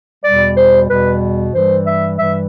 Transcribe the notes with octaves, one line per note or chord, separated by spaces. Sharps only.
E2 B2 G3 D5
C5
E2 B2 G3 B4
G2 E3 G3 C5
E5
G2 E3 G3 E5